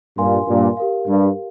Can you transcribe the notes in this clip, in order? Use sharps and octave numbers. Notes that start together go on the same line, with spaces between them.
G2 A#2 A#4 F5 G#5 C6
G2 A#2
G4 A#4 F5
G2